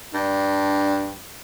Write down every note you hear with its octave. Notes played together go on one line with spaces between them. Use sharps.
G2 D4